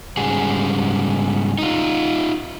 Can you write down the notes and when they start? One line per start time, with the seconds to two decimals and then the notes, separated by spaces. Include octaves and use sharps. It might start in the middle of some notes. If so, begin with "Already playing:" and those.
0.17 G#2 C#3 G3 F#4 G#4
1.58 D#4 F4